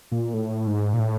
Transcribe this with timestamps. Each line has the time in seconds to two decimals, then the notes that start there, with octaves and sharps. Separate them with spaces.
0.12 A#2
0.34 A2
0.67 G#2
0.93 A#2
1.00 A2